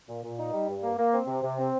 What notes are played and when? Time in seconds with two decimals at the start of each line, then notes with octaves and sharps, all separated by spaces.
0.08 A#2
0.23 A#2
0.38 D#4
0.53 G3
0.68 G2
0.82 A#3
0.98 A#3
1.12 C4
1.28 C3
1.43 C3
1.57 C4